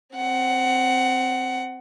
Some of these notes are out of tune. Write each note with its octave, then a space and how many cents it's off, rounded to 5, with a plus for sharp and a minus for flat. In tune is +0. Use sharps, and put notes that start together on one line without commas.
C4 -5 F#5 +15